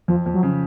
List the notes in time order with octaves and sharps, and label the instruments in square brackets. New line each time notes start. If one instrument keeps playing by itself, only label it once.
[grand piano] F2 [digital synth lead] F3
[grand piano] F2
[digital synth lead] F#3
[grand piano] C#3